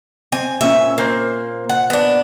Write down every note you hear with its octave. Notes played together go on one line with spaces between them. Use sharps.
C4 G#5
A#2 C#4 E5
A#3 A#4 C5
F#5
B3 D4